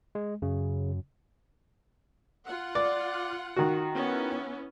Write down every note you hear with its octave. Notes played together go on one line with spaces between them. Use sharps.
G#3
F#2 C#3
F4 F#5
D5
D#3 F#4
B3 C#4 E4